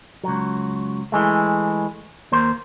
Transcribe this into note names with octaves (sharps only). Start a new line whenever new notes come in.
C#2 F#3
E3 G#3 A3
D#2 A#3 C5